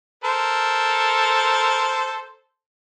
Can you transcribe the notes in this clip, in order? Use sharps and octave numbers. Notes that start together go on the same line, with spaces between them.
A4 A#4 C5